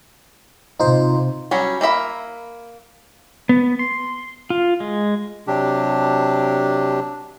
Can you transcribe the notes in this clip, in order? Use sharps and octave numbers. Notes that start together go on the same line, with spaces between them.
C3 D#4 F4 C5
F#3 G3 C#4
A#3 A#4 E5 B5
B3
C6
F4
G#3
C3 F#3 D4 G4